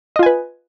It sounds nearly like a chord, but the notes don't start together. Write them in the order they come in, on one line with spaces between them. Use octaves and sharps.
D#5 F4 G#5 B4